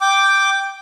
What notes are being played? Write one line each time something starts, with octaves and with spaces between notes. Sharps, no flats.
G5 D6